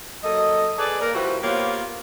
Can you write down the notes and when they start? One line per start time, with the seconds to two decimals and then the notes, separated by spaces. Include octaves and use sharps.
0.24 F#3 A#3 A4 D#5
0.78 G#4 A4 B4 D5
1.01 A#3 A#4
1.15 F3 G3 E4 F#4 B4 C5
1.43 A#3 B3 F4 G4 C5 C#5